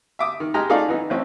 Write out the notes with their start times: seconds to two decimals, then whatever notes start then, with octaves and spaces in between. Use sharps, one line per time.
0.19 E5 D6 D#6
0.40 D#3
0.54 G#3 G4 D#5 A#5 F6
0.70 A3 D#4 F4 G#4 D5 F5
0.88 E3 B3 D#4
1.10 A1 E3 C4 C#4